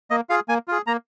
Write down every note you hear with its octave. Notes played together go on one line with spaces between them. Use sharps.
A#3 D#5
F4 G#4 F5
A#3 G#5
F4 G#4
A#3 A#5